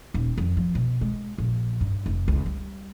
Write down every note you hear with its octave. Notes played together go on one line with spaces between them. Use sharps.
D#1
F2
F3
B2
G#3
A#1
G2
F1
C#2
G3